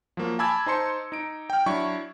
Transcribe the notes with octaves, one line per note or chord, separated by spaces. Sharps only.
F3 F#3 A#3
G#5 A5 B5 D6 E6 G#6
D#4 C5 A5 C6 C#7
D#4 D7
G5 F6
F#3 D4 E4 C#6